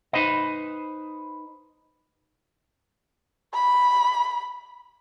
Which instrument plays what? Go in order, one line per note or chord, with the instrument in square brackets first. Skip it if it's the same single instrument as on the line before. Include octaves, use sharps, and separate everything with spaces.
[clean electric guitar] D#4 B4 C5 D#5
[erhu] B5